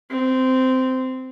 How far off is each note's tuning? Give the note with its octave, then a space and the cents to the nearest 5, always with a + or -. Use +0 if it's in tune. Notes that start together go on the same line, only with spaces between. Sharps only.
C4 -15